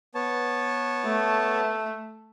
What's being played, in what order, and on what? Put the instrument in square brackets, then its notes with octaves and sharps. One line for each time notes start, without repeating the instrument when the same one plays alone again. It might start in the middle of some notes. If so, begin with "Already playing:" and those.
[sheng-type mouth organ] B3 C#5 A5
[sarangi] A3